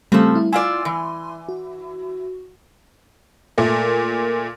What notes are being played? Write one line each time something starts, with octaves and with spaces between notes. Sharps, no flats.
C#3 F3 G3 A3 C4 A4
E4
E4 F4 D5 G#5 C6
E3
F#4
A#2 A3 A#3